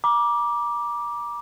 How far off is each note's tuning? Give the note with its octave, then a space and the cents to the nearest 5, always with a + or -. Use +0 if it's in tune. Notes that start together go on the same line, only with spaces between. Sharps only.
A#5 +40 D6 +0